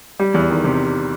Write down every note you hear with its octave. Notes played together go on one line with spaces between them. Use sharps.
G3
E2
D#3
C3